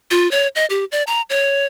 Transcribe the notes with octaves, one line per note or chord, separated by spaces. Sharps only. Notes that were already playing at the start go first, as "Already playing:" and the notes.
F4
C#5
D#5
G4
D5
A#5
C#5